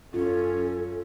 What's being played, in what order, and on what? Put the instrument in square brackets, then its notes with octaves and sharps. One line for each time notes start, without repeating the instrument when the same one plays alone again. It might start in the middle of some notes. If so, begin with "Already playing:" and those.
[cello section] F#2 C#4 C#5 [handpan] F4 [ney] A4